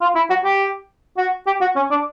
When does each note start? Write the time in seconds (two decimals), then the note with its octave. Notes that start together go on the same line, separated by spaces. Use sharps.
0.01 F4
0.15 E4
0.30 F#4
0.44 G4
1.18 F#4
1.47 G4
1.61 F#4
1.76 C#4
1.91 D4